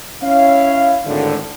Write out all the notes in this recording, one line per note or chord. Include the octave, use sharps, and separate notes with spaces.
C#4 E4 F5
G#1 A2 D3